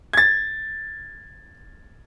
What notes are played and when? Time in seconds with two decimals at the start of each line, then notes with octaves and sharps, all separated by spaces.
0.13 G#6 A6